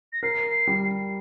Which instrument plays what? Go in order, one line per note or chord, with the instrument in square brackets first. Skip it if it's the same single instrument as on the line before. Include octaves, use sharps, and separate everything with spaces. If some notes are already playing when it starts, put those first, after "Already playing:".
[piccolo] A#6
[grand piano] A#4 [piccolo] C7
[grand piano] G3